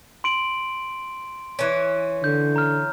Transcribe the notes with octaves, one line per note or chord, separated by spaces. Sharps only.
C6 D7 F#7
E3 C#4
D3 G6
A#5 F6